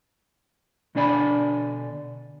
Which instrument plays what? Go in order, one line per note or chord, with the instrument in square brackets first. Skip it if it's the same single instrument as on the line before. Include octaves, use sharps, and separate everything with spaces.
[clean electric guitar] B2 D3 D4 D5 G#5 B5